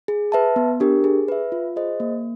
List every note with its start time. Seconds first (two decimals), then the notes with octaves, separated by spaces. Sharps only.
0.08 G#4
0.32 B4 E5 A5
0.56 B3
0.80 D4 G4 A#4
1.04 G#4
1.28 B4 E5
1.52 F4
1.76 G#4 C5 D#5
2.00 A#3